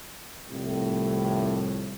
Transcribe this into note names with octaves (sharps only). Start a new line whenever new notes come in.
C2 F2 A2